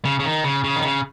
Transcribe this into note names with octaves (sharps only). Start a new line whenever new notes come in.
C#3
C#3
D#3
C#3
C#3
D#3
C#3